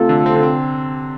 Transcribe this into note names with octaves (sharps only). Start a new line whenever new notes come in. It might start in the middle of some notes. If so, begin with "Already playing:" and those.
Already playing: C3 A3 F4 A4
D3
C4
D3
C4